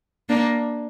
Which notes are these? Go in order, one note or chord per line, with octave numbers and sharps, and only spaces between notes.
A#3 D4